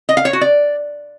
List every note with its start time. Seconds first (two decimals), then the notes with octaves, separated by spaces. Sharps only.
0.09 D#5
0.17 F5
0.25 C#5
0.33 F#4
0.41 D5